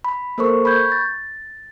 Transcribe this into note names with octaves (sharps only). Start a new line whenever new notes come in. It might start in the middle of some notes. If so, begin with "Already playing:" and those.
B5
A#3 A4 A#4 C5 C#6
B5 C#6 G6 G#6
A6